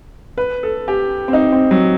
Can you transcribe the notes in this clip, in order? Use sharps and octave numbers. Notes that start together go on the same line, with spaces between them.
B4
A4
G4
C4
D#4
C4
F#3